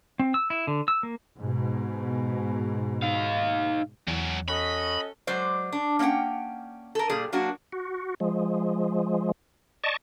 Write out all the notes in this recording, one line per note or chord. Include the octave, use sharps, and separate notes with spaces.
C4
E6
E4
D3
E6
A#3
G#2 B2
D#4 F5
E2 F#3 G#3
C#4 F#4 A4 D#5 B5
F#3 G#3 C5 D5
D4
A#3 C#4 C#5 F#5 G5
A4 A#4
A#2 G3 G#4 D5
F#3 A#3 D4 F#4
F#4
F3 G#3
D5 D#5 A5 C#6